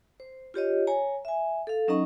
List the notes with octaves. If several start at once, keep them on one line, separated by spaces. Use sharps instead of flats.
C5
F4 G4 C#5 D#5
C#5 G#5 A#5
E5 G#5
A4 F5
F#3 C#4 D#4 D#5 A#5 C#6